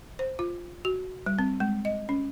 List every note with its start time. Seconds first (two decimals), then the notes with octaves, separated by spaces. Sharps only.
0.19 C5
0.39 F4
0.85 F#4
1.26 G3
1.39 C4
1.60 G#3
1.85 D#5
2.09 C#4